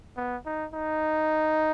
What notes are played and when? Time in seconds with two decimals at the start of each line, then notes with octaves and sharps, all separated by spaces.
0.17 B3
0.46 D#4
0.74 D#4